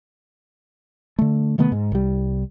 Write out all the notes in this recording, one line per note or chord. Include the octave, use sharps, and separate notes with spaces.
D3 A3
C3 D#3 A3 B3
G#2
C2 G3